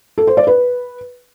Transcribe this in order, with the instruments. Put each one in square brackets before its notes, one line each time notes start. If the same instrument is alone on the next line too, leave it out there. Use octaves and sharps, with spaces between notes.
[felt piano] A4
C5
D5
B4